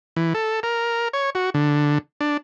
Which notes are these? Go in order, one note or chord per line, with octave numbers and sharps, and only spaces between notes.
E3
A4
A#4
C#5
F#4
D3
D4